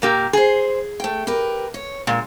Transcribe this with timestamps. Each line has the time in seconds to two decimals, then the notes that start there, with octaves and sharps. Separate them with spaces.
0.02 A#2 A#3 G4
0.33 G#4 C5 G#5
1.00 A3 G5
1.27 G4 A#4 B4
1.74 C#5
2.07 A#2 G#3